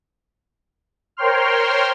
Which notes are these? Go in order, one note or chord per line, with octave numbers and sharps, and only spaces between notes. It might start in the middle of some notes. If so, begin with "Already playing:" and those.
A#4 C5 C#5 G5 C6 F6